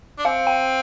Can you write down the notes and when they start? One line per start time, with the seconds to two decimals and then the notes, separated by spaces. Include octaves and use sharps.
0.18 D4
0.25 C4 F5
0.47 G5